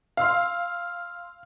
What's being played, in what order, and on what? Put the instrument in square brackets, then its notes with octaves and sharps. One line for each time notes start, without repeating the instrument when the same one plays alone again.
[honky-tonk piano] F5 [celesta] C6 E6 F6